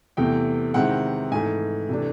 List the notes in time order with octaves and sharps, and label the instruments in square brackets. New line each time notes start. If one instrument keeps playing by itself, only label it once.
[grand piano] E2 C3 E3 A3 G5
C3 D#3 G#3 C4 E4 F#5
G#2 E3 A3 G#5
C3 E3 A3 D4